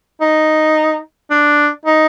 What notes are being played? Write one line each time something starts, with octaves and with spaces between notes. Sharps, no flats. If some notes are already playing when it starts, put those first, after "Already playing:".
D#4
D4
D#4